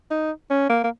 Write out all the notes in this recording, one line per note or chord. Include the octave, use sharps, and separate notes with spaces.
D#4
C#4
A#3
A#3